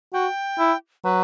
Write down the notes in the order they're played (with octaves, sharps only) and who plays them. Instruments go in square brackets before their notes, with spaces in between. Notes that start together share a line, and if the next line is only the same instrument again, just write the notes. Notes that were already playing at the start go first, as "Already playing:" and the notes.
[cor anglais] F#4 [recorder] G5
[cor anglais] E4
[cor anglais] F#3 [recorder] B4